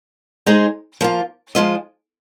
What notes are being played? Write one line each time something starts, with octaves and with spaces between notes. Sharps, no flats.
G#3 D#4 G#4 C5
F3 A#3 F4
F3 G#3 F4 C5 D#5